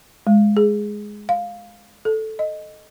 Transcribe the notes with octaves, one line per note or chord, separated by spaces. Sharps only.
G#3
G#4
F5
A4
D#5